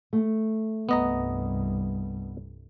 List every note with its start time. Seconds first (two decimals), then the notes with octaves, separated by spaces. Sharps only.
0.13 A3
0.89 C2 G2 B3 D#5 A#5